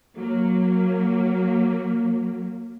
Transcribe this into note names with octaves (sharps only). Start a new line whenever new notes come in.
F#3 A#3